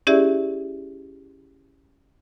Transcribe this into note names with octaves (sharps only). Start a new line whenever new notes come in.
C#4 E4 G4 G#4 D5 E5